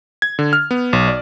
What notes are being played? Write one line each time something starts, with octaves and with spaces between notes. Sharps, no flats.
G#6
D3
F6
B3
B1
D5